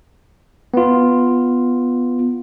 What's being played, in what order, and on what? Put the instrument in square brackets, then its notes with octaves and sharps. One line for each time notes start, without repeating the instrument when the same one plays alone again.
[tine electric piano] B3 F4